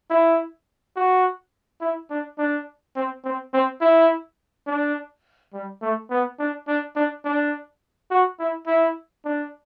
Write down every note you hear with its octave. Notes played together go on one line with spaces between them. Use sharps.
E4
F#4
E4
D4
D4
C4
C4
C4
E4
D4
G3
A3
B3
D4
D4
D4
D4
F#4
E4
E4
D4